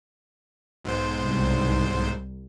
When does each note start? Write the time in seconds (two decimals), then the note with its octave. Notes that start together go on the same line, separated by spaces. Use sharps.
0.85 B1 G#2 C5
1.19 C2